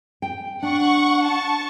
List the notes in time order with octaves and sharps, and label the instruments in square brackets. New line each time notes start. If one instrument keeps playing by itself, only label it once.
[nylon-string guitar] G5
[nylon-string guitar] D4 [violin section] F#5 C#6
[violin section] A5 C#6